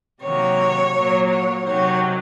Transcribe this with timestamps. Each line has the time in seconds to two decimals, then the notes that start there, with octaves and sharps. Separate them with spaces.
0.21 C3 D#3 F#3 A#3 C#5
0.93 A#2 F#3 A#3
1.28 C#5
1.64 C3 D#3 F#3 C#5